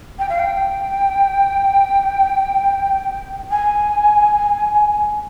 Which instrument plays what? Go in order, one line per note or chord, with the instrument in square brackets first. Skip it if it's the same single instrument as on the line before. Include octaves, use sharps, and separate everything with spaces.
[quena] G5
F5
G5
G#5